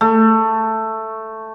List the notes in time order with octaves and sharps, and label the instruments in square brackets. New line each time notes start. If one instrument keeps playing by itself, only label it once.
[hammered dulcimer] A3